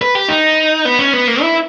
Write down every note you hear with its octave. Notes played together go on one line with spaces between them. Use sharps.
B4
G4
D#4
B3
C#4
B3
A#3
E4